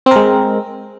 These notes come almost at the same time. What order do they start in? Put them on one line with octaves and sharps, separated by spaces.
C4 A#4 G#3